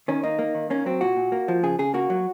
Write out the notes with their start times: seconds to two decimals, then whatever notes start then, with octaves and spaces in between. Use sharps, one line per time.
0.08 D#3 C#4
0.23 A#3 D#4
0.39 A#3
0.55 D#3
0.70 A#3 C#4
0.86 F#3 C4
1.01 A#2 F#4
1.16 A#2
1.32 A#3
1.48 F3
1.63 C#3 G#4
1.79 C#3 G#4
1.94 A#3 F#4
2.10 F#3